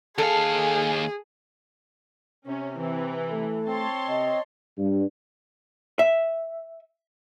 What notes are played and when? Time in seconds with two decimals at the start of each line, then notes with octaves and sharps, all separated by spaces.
0.18 D#2 G#4 A4 F5 G#5
2.47 C3 C#4
2.78 E3 C4
3.31 A3 A4
3.66 C4 C#5 A5 C6
4.08 C3 D#5
4.79 G2
5.99 E5